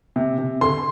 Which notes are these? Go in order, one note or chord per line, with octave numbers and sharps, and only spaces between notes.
C3
C3
D3 C6